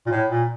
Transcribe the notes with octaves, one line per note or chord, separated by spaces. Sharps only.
A#2
A2
A#2